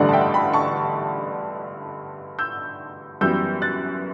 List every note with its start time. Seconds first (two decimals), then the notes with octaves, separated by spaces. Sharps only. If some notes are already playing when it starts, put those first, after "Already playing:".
Already playing: A1 G2 D3 A3 D5 F#5
0.09 A5
0.12 E5 G5
0.34 G5 B5
0.53 A5 C#6
2.39 E6 G6
3.21 F#2 E3 G3 B3 E6 G6
3.62 F#6 A6